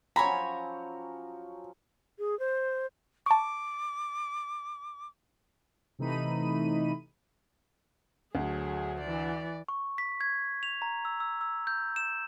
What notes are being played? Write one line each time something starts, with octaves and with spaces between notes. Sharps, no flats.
F3 F#3 C#4 C#5 G#5 A#5 B5
G#4
C5
A5 C#6 D6
C3 E3 A3 D#4 B5 D#7
D2 F#3 G#4
E3 D5
C#6
B6
G#6
F7
A#5
E6
E6
E6
G6
E7